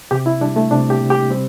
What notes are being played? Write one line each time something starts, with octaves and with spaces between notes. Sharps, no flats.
C3 G4
E4
G3 D4
A3
C3 D4
G4
C3
G4
G3 C4